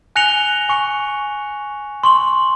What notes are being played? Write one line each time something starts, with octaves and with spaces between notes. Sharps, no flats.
G#5 F#6 A#6 C#7 F7 G7
G#5 C#6 C#7
C6 C#6 F#7